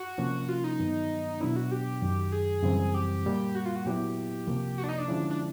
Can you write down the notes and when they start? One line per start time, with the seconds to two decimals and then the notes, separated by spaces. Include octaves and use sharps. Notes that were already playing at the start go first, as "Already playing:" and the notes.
Already playing: F#4
0.18 C3 F3 A#3 C#4
0.49 F4
0.64 D#4
0.79 G2 D#3 F#3 B3
1.41 B2 F#3 B3 D4 E4
1.56 F#4
1.71 G4
2.02 F#2 D#3 F#3
2.32 G#4
2.63 F#2 C#3 E3 G3 C4
2.94 G4
3.25 A#2 G3 A#3
3.55 F#4
3.65 F4
3.76 F#4
3.86 A#2 F#3 B3 E4 G4
4.47 C#2 C3 F3 A#3
4.78 F#4
4.84 D4
4.89 D#4
4.98 D4
5.08 D3 F3 G#3 C#4 E4
5.30 D4